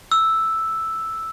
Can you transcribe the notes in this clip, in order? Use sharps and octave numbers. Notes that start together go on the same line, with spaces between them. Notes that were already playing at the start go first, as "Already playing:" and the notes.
E6